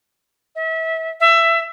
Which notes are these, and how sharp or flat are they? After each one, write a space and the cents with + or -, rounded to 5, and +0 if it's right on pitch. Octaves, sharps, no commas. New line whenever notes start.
E5 -30
E5 +20